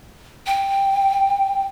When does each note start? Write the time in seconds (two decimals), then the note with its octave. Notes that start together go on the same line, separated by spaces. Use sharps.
0.47 G5